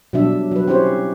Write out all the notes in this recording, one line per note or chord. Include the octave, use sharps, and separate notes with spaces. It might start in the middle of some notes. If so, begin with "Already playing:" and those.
B2 F#3 G3 D4 E5
F#3 B4
C4 C#4 E4 G4 C5 C#5